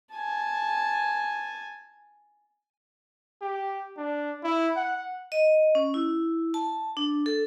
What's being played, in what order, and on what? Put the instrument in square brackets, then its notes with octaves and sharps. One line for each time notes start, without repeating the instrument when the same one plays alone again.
[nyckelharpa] G#5 A5
[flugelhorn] G4
D4
E4
F#5
[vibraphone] D#5
C#4
E4
A5
D4
A4